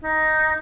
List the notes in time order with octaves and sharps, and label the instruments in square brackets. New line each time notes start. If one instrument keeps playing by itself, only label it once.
[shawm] D#4